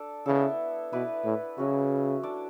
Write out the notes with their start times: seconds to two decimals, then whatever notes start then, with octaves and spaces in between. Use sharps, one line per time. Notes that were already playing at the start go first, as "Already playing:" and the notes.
Already playing: D4 A4 D5
0.26 C#3 B3 E4 A4
0.93 B2 E4 B4 D5
1.24 A2
1.58 C#3 F#3 C#4 F#4
2.23 D4 A4 D5